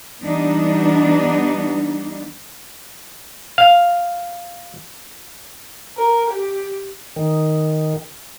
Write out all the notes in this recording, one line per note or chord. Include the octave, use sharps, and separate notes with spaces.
E3 G3 B3 D4 D#4
F5
A#4
G4
D#3